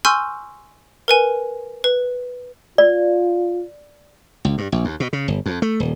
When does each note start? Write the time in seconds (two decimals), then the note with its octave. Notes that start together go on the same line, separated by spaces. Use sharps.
0.05 G#5 C6 C#6 E6 F6 G6
1.08 A#4 B4 G#5
1.84 B4
2.78 F4 D5
4.45 C#2
4.58 G2
4.72 A#1
4.85 D#2
5.00 B2
5.13 C#3
5.28 G1
5.46 F2
5.62 A3
5.80 D#1